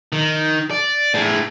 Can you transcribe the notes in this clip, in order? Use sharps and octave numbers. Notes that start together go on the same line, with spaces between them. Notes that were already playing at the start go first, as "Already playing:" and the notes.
D#3
D5
A2 G#4